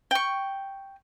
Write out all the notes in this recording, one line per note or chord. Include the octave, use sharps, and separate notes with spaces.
G5 C#6